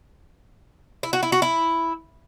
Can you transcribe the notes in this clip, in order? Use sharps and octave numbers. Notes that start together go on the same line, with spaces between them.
E4
F#4
E4
F#4
E4